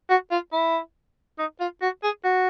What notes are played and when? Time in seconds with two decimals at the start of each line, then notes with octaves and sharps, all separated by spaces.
0.10 F#4
0.31 F4
0.53 E4
1.39 D#4
1.60 F4
1.82 F#4
2.03 G#4
2.24 F#4